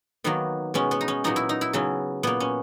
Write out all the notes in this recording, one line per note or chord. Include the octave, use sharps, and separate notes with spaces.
D#3 F#3 A#3 B3
B2 G#3 B3 C#4
B3
D#4
C#4
A#2 F#3 B3 D#4
E4
D#4
E4
C#3 F#3 B3 C#4
A#2 A#3 B3
C#4